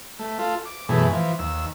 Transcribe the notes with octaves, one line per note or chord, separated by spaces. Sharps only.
A3
F4 A4
D6
F#2 B2 E3 A3 G#4
E3 F3
D#2 E6